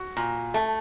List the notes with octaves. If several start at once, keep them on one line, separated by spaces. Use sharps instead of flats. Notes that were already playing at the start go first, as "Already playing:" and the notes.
Already playing: F#4
A#2
A3